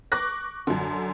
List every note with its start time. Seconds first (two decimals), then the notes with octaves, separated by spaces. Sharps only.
0.12 C#6 D6 F#6 A#6
0.67 F#2 D3